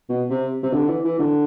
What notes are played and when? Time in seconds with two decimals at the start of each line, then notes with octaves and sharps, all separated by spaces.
0.09 B2
0.30 C3
0.63 C3
0.73 D3
0.88 E3
1.04 E3
1.19 D3